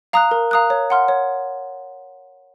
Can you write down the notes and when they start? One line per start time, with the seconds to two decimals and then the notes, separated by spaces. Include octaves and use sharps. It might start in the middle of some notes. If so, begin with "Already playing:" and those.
0.13 F5 A#5 D#6 F#6
0.31 A#4
0.51 F5 A#5 D#6 F#6
0.70 C#5
0.90 F#5 C6 F6
1.08 C#5